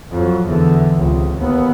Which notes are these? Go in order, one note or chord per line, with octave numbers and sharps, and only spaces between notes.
F2 F#3
E2 D3
C#2 C3
D#2 B3